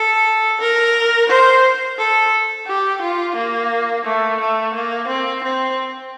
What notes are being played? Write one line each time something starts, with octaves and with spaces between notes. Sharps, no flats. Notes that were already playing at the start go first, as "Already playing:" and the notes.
Already playing: A4
A#4
C5
A4
G4
F4
A#3
A3
A3
A#3
C4
C4